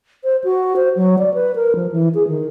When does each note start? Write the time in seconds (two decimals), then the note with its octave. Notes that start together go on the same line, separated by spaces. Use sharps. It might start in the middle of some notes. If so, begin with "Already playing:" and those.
0.24 C5
0.44 F#4
0.76 C5
0.96 F#3
1.18 D5
1.34 B4
1.55 A#4
1.75 F3
1.92 E3
2.15 G#4
2.28 D#3